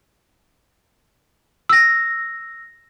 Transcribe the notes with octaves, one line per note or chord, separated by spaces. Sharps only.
E6 A#6